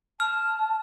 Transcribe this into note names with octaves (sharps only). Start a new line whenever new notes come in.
A5 F6